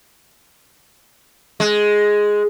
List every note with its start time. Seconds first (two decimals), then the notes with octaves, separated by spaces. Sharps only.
1.60 G#3